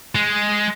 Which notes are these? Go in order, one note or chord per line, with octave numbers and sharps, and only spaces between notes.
G#3